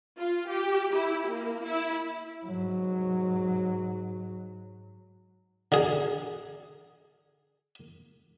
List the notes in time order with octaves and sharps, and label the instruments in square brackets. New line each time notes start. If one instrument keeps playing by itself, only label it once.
[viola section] F4
G4
E4
A#3
E4
[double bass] G#2 F#3
[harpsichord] D3 G#4